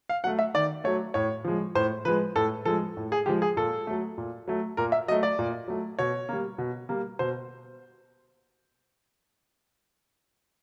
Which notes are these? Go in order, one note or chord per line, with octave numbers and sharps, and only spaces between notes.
F5
F#3 A3 F#5
E5
D#3 D5
F#3 A3 C#5
A2 C#5
F3 G#3
A2 C5
F3 G#3 B4
A2 A4
F3 G#3 A4
A2
G#4
F3 G#3 G4
G#4
A#2 A4
F#3 A3
A#2
F#3 A3
A#2 A#4
E5
F#3 A3 D#5
D5
A#2
F#3 A3
B2 C#5
G3 A#3
B2
G3 A#3
B2 C5